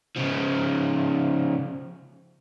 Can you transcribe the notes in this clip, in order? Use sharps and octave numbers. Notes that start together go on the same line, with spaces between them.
C#3 F3